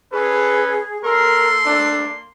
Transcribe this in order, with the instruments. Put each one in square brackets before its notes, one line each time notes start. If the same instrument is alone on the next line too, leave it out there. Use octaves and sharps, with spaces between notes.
[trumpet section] C#4 A4 [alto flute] G#4 [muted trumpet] B4
[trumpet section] A#3 C6 [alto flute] A4 [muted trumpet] A#4
[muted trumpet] D4